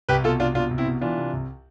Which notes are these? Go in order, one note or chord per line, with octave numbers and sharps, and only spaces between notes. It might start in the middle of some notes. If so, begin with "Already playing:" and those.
C2 G4 B4
B2 F4 A4
C2 D4 F4
B2 D4 F4
C2
C4 E4
B2
E3 D4 F4
C3
C2